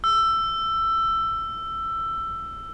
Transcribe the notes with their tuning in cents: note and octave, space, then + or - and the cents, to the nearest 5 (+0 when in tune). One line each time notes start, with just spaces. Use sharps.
E6 +15